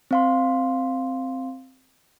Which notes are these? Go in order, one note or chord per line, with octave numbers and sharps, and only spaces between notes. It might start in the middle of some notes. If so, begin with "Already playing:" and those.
C4 F5 C6